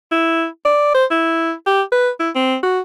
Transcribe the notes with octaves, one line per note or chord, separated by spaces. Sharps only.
E4
D5
C5
E4
G4
B4
E4
C4
F#4